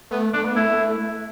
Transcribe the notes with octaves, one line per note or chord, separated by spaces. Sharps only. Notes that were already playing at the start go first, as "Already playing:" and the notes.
A3 B3
A3 D4
B3
A3 E4